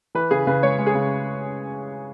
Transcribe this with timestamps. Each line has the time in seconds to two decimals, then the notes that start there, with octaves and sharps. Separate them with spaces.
0.15 E3 B4
0.31 C#3 G#4
0.47 C#3 B4
0.63 G#3 C#5
0.78 G#3
0.86 G#4
0.95 C#3